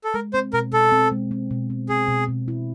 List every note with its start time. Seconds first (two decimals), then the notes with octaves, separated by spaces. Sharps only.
0.04 A4
0.14 G#3 A#4
0.33 C4 C5
0.53 B2 A#4
0.72 B2 A4
0.92 C4
1.11 G#3
1.31 C4
1.51 B2
1.70 C4
1.89 C4 G#4
2.09 B2
2.28 B2
2.48 E4